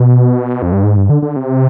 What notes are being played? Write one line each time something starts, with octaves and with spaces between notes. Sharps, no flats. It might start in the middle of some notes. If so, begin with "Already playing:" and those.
Already playing: B2
F2
G2
G#2
G2
D3
D3
C3